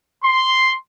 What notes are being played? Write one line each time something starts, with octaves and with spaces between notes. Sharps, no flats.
C6